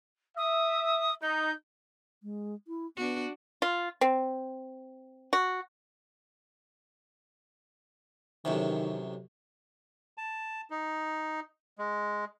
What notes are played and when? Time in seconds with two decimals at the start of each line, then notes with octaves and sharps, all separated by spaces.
0.37 E5 D#6
1.22 D#4 G6
2.23 G#3
2.68 E4
2.97 B3 D4 F#4
3.62 F4
4.01 C4
5.33 F#4
8.45 A1 F#2 C3 D#3
10.18 A5
10.70 D#4
11.78 G#3